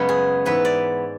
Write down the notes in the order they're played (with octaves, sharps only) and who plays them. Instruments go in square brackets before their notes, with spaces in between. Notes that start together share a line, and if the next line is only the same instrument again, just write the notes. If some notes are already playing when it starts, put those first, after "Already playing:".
Already playing: [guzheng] F#2 C#3 G#3 B3
G#4
G#2 E3 B3 B4
D5